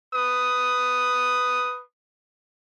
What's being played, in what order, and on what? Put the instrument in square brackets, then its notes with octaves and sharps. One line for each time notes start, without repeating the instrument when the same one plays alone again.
[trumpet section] B4 D#6